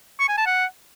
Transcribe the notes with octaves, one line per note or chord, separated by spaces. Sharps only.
C#6
G#5
A5
F#5